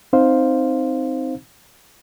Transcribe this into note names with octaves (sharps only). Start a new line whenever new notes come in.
C4 D#4 C5 F5